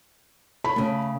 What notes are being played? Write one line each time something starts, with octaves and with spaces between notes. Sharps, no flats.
B5
C#3 A3